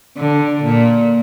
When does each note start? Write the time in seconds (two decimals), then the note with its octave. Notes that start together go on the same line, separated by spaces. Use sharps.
0.17 D3
0.63 A#2